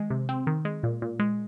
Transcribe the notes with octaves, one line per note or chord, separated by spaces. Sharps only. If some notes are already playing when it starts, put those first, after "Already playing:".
Already playing: D#3 G#3
C3
C4
D#3
G#3
A#2
A#2
G#3